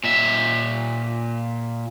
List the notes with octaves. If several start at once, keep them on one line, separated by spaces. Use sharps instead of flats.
A#2 E5